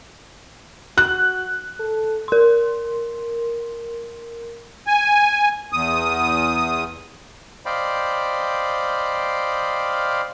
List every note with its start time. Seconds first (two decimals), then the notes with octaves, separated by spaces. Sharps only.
0.98 F#4 F#6
1.80 A4
2.28 A#4 C6
4.87 G#5
5.73 E2 D#6
7.66 C5 D5 D#5 F5 G5 B5